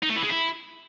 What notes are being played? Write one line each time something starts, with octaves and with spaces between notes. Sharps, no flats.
D#4
A3
E3
G#3
E4